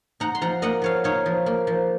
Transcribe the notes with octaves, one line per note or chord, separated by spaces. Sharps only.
D#4 F#5 A#5
C6
F3 F#5 A#5
A#3 D#5 F#5
F3 C#5 F5
D#4 C#5 F5
F3
A#3
F3